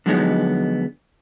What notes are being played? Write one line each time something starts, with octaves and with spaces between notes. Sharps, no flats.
D3 F3 F#3 G#3 B3 D#4